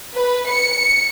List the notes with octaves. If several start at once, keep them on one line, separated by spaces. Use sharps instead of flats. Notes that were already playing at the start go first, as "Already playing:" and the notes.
B4
C#7